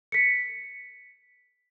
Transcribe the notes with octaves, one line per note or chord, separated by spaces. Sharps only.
B6 C#7